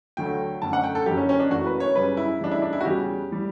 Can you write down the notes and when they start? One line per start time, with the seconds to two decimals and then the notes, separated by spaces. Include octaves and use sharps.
0.17 D2 D3 F#3 A3 G5
0.62 F#2 D3 A3 A5
0.73 F#5
0.84 G5
0.95 A4
1.06 F#1 F#2 D3 G4
1.17 C#4
1.29 C#4
1.40 D4
1.50 F#1 F#2 E3 A3 F#4
1.66 B4
1.80 C#5
1.96 F#2 C#3 G3 B4
2.17 E4
2.40 D2 C#3 E3 G3 D4
2.51 E4
2.62 D4
2.73 E4
2.81 F#4
2.84 E2 C#3 G3 G4
3.31 A2 G3